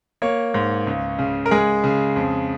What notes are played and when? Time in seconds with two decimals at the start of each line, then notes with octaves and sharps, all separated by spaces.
0.22 A#3 C#5
0.54 G#2
0.87 C#2
1.19 C#3
1.46 A#4
1.51 G#3 G#4
1.84 C#3
2.16 F2